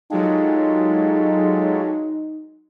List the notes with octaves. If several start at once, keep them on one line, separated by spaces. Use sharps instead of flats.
F#3 G#3 D#4 F4 G4 A4